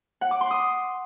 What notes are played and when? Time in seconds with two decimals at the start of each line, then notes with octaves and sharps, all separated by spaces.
0.21 F#5
0.31 D6
0.41 C6
0.51 D#6